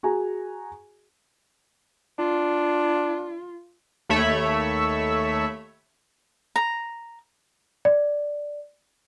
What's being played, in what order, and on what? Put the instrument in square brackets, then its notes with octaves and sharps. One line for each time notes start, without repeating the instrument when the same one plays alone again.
[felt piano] F#4 G#4 G#5 A#5
[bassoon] D4 [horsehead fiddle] F4
[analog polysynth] D#2 A3 C#5 E5 B5
[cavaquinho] A#5
[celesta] D5